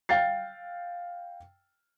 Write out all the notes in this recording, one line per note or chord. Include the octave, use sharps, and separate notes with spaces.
F5 G5 A6 C7